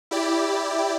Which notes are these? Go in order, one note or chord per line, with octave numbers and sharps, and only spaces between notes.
E4 G4 D5